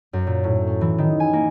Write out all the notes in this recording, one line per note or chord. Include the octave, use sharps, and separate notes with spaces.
F#2
A#2
A2
C#4
E3
D#3
G#5
A#3